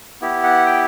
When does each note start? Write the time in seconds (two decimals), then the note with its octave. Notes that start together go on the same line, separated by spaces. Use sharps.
0.21 B3 E4 G4
0.44 F#5
0.66 G5